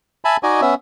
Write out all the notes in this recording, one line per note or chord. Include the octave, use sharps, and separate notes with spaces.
E5 G#5 A5 B5
D#4 F#4 D5 D#5 G#5
B3 C#4 E5